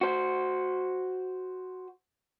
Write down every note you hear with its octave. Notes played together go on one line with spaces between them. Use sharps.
F#4 C5